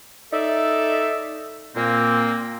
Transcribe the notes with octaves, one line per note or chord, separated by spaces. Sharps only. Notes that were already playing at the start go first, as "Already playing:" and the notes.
D#4 A4 D5 E5
A#2 A#3 C4